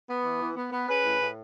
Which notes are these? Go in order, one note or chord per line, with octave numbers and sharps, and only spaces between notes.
B3
E3
E3
B3
B3
C#4 G#4 B4
A2
A2